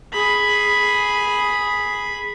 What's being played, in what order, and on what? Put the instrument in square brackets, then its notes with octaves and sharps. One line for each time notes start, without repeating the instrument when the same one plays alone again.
[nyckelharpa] G#4 B5